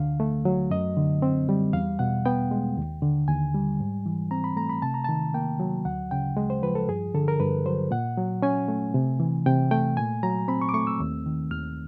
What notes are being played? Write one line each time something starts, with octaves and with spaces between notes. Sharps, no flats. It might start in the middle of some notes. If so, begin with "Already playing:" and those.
Already playing: D2 D3 F5
A3
F#3
F#2 D#5
D3
C4
G3
E2 F5
B2 F#5
B3 G5
G#3
D#2
D3
D#2 G#5
G3
G#2
E3
C4 A#5
B5
A3 A#5
B5
C3 A5
A#5
D#3 A5
A#3 G5
F#3
D2 F#5
C#3 G5
G#3
C5
F3 B4
A4
G2 G#4
D3 A4
A#4
G2 B4
F#3 C5
A#2 F#5
F#3
C#4 G#5
A3
C3
E3
C3 G5
A3 G5
A#2 G#5
F#3 A#5
C4 B5
C#6
D6
A3 C#6
E6
D#2
D#3
D#2 F6